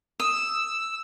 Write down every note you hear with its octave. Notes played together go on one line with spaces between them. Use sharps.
D#6 E6